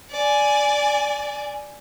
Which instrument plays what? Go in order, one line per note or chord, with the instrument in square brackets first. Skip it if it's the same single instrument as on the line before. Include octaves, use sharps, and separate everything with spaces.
[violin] D5 G#5